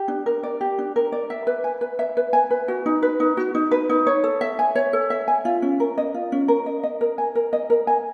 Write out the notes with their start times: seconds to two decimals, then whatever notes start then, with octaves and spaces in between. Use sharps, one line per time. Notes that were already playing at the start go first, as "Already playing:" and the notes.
Already playing: G4
0.08 D4
0.26 A#4
0.43 D5
0.61 G4
0.79 D4
0.96 A#4
1.12 D5
1.30 E5
1.47 B4
1.64 G#5
1.81 B4
1.99 E5
2.17 B4
2.33 G#5
2.51 B4
2.68 F#4
2.86 D#4
3.02 B4
3.20 D#4
3.37 F#4
3.55 D#4
3.71 B4
3.90 D#4
4.07 C#5
4.24 A4
4.41 E5
4.59 G#5
4.75 C#5
4.93 A4
5.10 E5
5.28 G#5
5.45 F4
5.62 C#4
5.80 A#4
5.98 D#5
6.14 F4
6.32 C#4
6.48 A#4
6.66 D#5
6.83 D#5
7.01 A#4
7.18 G#5
7.35 A#4
7.53 D#5
7.70 A#4
7.87 G#5